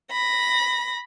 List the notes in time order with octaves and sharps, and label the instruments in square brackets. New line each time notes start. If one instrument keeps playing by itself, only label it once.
[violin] B5 A#6